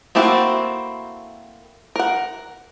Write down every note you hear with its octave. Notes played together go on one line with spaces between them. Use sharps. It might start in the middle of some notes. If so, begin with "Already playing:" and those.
A3 A#3 C4 E4 F#4
A#4 F#5